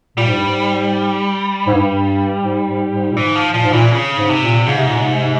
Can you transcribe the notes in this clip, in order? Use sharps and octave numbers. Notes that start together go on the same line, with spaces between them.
A#2 G3
G#2
G2
G#2
G#2
G2
G2
G#2
G#2
G#2
A#2
G#2 E3
F3
A#2 F3
G#2
A#2 E3
C#3
G#2
C3
A#2
G#2 C#3
C3
A#2
C3